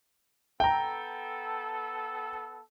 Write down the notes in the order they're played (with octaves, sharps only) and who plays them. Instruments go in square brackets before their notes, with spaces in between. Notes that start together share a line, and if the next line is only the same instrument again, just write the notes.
[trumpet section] B3 A4 [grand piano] G5 A#5